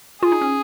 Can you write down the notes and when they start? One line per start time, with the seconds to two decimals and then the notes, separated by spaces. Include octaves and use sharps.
0.22 F4 G#4
0.32 D#4
0.41 C#4